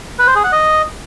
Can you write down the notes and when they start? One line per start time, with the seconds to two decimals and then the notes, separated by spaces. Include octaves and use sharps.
0.19 B4
0.27 C5
0.36 G#4
0.44 F#5
0.52 D#5